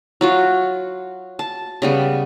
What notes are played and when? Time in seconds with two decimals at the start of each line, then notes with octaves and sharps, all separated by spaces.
0.21 F#3 F4 F#4
1.39 A5
1.82 C#3 G3 B3